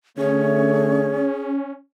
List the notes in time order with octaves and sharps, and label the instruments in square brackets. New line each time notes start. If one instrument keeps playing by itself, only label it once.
[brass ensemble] D3 A3 [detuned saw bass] C#4 [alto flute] G#4 [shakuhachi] C#5